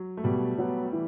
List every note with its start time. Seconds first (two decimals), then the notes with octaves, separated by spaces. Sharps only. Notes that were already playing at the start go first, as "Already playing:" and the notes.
Already playing: F#3
0.17 A3
0.24 B2 G3
0.58 F#3 B3
0.93 E3